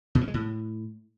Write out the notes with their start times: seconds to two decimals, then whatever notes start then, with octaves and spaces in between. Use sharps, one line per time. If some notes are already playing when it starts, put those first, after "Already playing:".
0.15 B2
0.21 F3
0.28 G#3
0.34 A2